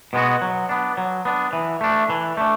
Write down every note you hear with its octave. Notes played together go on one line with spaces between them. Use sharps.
B2 G#3 B3 F#4
F#3
B3 D4
F#3
B3 D4
E3
A3 D4
E3
A3 D4